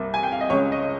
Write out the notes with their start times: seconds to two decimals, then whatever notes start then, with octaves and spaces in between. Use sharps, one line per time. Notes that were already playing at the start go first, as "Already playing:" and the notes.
Already playing: C2 C3 G3 A#3
0.14 G#5
0.23 G5
0.32 F5
0.41 D#5
0.50 C#2 C#3 G#3 C#5
0.72 D#5